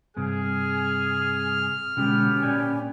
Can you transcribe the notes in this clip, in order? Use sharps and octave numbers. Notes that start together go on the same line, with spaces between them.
G2 C3 G#4 F6
B2 D3 G#3 B3 C#4 G4
A#2 D5 G#5